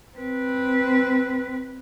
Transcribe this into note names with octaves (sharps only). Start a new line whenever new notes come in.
C4 B4